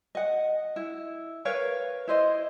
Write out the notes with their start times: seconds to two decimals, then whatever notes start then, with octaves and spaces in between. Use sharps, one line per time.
0.15 D#5 F#5
0.76 E4
1.45 A#4 B4 C#5 F5
2.08 E4 C5 D#5